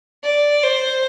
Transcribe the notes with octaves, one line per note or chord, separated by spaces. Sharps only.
D5
C5